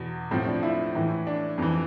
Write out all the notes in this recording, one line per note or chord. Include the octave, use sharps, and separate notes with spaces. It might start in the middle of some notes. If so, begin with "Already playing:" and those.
Already playing: E2 B2
A2 F3 C4
D4
E4
A2 E3
D4
F2 E3